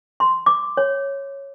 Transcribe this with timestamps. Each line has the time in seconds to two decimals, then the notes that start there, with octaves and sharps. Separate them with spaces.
0.20 C6
0.46 D6
0.77 C#5